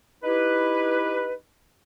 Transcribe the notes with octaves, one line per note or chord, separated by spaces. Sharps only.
D#4 E4 G4 B4